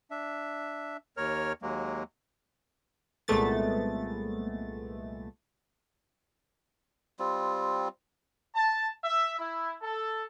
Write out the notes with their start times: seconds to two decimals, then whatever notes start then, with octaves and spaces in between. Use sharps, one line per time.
0.11 D4 E5
1.17 D#2 A#4 C#5 F6
1.62 D#2 F#3 G#3 A#3
3.28 C2 A#2 G#3 A3 B3 A6
7.19 G3 C4 F4
8.55 A5
9.04 E5
9.39 E4
9.82 A4